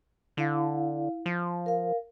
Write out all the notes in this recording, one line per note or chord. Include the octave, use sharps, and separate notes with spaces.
D3 E4 F5
F3
A#4 F5